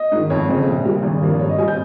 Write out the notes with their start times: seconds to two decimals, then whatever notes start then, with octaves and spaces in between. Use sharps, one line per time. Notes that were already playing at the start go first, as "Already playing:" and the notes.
Already playing: D#5
0.12 G#2 D#3
0.30 F2 C#5
0.48 C#3 F3 G#3 C4
0.67 A#1
0.85 A#2 G3
1.03 G#1
1.21 G2 F3 A#3
1.39 G2 C#5
1.49 D#5
1.58 G3 C4 G#5
1.68 G6